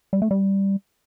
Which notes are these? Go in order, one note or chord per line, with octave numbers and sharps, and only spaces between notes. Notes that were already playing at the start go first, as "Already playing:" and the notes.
G3
A3
G3